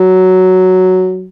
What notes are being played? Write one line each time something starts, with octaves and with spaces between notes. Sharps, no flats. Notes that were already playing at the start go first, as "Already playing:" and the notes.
Already playing: F#3